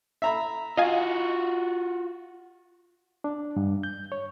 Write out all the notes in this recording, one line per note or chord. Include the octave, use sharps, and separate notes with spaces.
E5 A#5 B5
F4 F#4 D#5 F5 G#5
D4
G2
G6
C#5